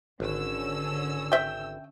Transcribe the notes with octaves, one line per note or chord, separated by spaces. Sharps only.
G#1 D3 C#4 E6
E5 G5